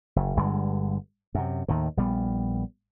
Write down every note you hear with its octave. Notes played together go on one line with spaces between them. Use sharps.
F#1
G1 G2 D3 G#3
F#2 C3
D#2 A2 D#3
A#1 G3 B3